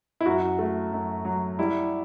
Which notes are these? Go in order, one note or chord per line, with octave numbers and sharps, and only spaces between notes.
E4
F#2 F#4
A3
F#2
F#3
G3 E4